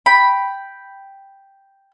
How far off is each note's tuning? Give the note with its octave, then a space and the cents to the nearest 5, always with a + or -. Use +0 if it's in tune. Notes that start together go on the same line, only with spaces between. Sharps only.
G5 +0 B5 +0